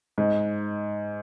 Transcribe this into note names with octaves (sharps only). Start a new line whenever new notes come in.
G#2